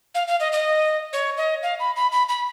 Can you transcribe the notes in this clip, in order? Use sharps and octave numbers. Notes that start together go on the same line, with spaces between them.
F5
F5
D#5
D#5
C#5
D#5
F5
B5
B5
B5
B5